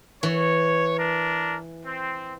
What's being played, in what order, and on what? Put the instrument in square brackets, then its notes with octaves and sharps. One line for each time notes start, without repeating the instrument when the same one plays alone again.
[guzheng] E3 [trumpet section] C#5
[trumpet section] D4 A#4
C4